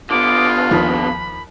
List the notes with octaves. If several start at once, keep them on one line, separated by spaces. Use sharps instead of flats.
D3 B3 F4 D6
D#2 F3 B5